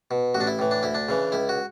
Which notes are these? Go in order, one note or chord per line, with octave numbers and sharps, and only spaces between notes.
B2
A1 F#4
D4
E4
A2 E3
D4
D2 E4
D4
C#3 E3
C#2 E4
F#4